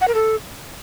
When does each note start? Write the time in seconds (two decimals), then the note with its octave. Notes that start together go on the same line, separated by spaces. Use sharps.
0.01 F#5
0.08 A#4
0.15 A4